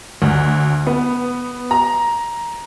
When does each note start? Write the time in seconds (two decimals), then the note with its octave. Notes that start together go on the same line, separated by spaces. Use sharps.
0.22 D2
0.87 B3
1.71 A#5